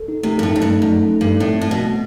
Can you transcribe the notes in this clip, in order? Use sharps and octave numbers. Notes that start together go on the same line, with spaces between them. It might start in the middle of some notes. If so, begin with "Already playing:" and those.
Already playing: A4
D#4
C3 A3
G2 A4
A2
F#2 D#4
G2
A3
F#2 A3
A4
A3
G2
A4
A2 C4
A3
A2
B2 A3
A3